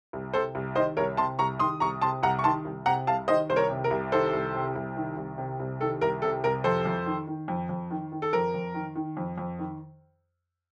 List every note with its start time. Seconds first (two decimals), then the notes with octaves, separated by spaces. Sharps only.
0.13 C2
0.34 C3 A4 C5
0.55 C2
0.75 D#3 C5 D#5
0.97 C2 A#4 C#5
1.17 C3 A5 C6
1.39 C2 A#5 C#6
1.59 D#3 C6 D#6
1.80 C2 A#5 C#6
2.01 C3 A5 C6
2.23 C2 F#5 A#5
2.39 C#6
2.44 D#3 A5 C6
2.65 C2
2.86 C3 F#5 A#5
3.07 C2 F5 A5
3.28 D#3 C5 D#5
3.49 C2 C5
3.56 A#4 C#5
3.70 C3
3.84 A#4
3.91 C2
4.12 D#3 A4 C5
4.33 C2
4.55 C3
4.75 C2
4.97 D#3
5.17 C2
5.38 C3
5.60 C2
5.80 D#3 A4
6.01 C2 A#4
6.22 C3 A4
6.44 C2 A#4
6.64 F2 A4 C5
6.85 F2
7.06 D#3
7.27 D#3
7.48 F2
7.69 F2
7.91 D#3
8.12 D#3
8.22 A4
8.33 F2 A#4
8.54 F2
8.74 D#3
8.96 D#3
9.17 F2
9.38 F2
9.59 D#3